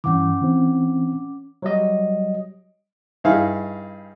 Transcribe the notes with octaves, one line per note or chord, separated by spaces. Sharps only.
G2 E3 C#4 F#5 D6
E3 C4
F#3 G3 D#5
G2 D#4 E4 G#4 F5